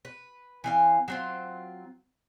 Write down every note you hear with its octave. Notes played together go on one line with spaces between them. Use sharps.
B4
E3 C4 F5
F#3 C4 F4